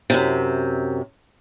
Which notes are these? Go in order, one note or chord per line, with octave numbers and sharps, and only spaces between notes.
F#2 A2 C3